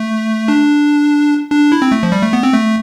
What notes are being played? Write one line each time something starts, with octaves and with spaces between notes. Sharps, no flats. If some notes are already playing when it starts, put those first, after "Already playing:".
Already playing: A3
D4
D4
E4
C4
A3
F3
G3
A3
B3
C4
A3